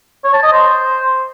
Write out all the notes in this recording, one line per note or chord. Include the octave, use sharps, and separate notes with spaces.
C#5
A5
D#5
C5